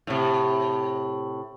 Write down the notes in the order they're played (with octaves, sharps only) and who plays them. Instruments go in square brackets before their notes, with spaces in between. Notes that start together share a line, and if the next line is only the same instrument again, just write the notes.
[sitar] A2 C3